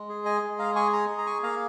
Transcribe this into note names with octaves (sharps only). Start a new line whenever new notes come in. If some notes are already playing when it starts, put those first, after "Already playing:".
Already playing: G#3
G#4
D#5 G#5
G#3
F5 A#5
G#4 G#5 C#6
A#5 D#6
G#4
A#5
G#5 C#6
A#3 F5 A#5